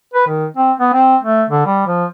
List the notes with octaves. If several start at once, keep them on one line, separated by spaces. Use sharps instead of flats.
B4
D#3
C4
B3
C4
A3
D3
G3
F3